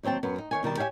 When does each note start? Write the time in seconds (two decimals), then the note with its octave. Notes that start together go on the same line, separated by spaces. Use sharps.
0.03 D#2 F#3 C4 G5 A5
0.23 F#2 B3
0.38 D#4
0.51 D#3 C#5 G#5
0.63 B2 D#3 G3 A5
0.77 G4 C#5 E5 F5 G#5